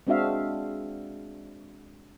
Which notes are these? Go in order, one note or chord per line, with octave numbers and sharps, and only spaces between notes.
G#3 C4 D4 F#4 E5 F5